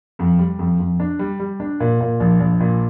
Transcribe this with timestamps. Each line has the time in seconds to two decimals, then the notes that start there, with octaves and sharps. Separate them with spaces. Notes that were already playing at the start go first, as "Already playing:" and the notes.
0.19 F2
0.39 G3
0.59 F2
0.79 F2
1.00 D4
1.19 G3
1.40 G3
1.60 D4
1.80 A#2
2.01 A#2
2.20 A#1
2.40 A#1
2.60 A#2